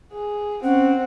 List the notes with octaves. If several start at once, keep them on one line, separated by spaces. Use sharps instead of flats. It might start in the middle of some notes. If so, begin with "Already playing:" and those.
G#4
C4 C#4 F#5